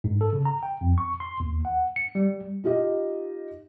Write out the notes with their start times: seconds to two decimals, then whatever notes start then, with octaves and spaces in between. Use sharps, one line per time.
0.04 G#2
0.21 A4
0.33 C#3
0.45 A#5
0.63 G5
0.81 F2
0.98 C#6
1.20 C6
1.40 D#2
1.65 F#5
1.96 C#7
2.15 G3
2.64 D#4 F4 G4 D#5